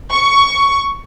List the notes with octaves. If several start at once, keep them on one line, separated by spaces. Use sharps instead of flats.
C#6